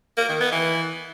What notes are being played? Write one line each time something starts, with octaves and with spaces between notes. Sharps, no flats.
A#3
D#3
B3
E3